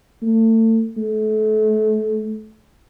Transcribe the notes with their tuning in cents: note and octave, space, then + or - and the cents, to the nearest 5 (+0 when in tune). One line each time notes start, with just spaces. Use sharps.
A3 +35
A3 -30